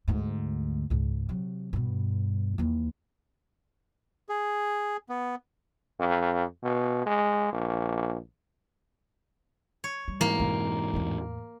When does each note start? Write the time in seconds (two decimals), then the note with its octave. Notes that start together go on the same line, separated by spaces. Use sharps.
0.08 D2 G#2
0.90 C#2 G#2
1.29 C3 F#3
1.73 G2 B2
2.58 D#2 E3
4.29 G#4
5.09 B3
6.00 F2
6.63 B2
7.06 G#3
7.52 A#1
9.84 C#5
10.08 G3
10.21 G#2 E3 A#3
10.39 F2 B2
10.93 E2 A2